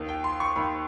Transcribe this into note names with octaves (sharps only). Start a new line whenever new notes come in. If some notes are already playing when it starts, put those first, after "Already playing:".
Already playing: D#2 D#3
G5
C6
C#6
D#2 D#3 B5